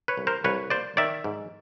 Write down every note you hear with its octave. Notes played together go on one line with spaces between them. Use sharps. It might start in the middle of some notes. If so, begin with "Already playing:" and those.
B4 C#5
C2
A#4 C5
C2 B4 C#5
A#3 C5 D5
D#3 D5 E5
G#2